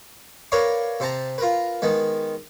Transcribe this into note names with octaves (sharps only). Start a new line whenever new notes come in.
A#4 B4 C#5 D5 F5
C3 C5 A5 A#5
F4 A#4 B4
D#3 G#3 B3